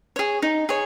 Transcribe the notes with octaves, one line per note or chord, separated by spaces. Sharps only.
G#4 C#5
D#4
G#4 C#5